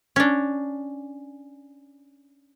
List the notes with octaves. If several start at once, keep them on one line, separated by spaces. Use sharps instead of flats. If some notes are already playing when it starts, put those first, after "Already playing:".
C#4 D4